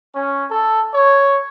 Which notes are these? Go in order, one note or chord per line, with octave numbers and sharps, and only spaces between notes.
C#4
A4
C#5